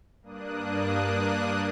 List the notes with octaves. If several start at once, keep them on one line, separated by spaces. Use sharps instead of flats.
G2 A#3 D4 D#6 F#6